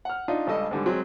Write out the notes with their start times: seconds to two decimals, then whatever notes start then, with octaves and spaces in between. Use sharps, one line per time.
0.05 F#5 F6
0.28 D4 D#4 F4
0.47 C#2 G2 A4 D#5
0.71 G#2 D3 G3
0.86 F#3 G#3 C4